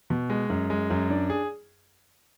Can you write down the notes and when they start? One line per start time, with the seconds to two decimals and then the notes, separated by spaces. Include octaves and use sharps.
0.10 B2
0.30 G#3
0.50 F#2
0.70 G#3
0.90 F#2
1.10 D4
1.30 G#4